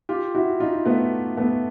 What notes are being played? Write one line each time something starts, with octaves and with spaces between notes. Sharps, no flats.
F4 G4
E4 F#4
D#4 F4
A3 B3
A3 B3